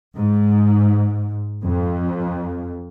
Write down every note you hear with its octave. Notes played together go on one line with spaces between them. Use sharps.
G#2
F2